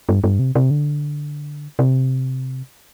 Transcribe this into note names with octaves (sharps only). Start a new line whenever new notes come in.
G2
G2
C3
C3
D3
C3